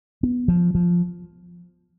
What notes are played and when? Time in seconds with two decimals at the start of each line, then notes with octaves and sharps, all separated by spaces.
0.23 B3
0.48 F3
0.75 F3